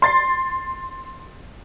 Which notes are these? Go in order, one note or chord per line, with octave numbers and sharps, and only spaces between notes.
C6 A6 C7